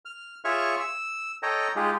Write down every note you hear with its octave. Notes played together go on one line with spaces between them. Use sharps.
F6
F4 G#4 C#5 E5 C#6 F6
E6
A4 C#5 D#5 G5 A#5
G#3 D#4 F4 G4 G#4